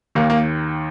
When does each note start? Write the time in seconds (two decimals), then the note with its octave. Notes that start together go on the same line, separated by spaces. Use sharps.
0.15 D#2 D#3 A#3
0.30 A#3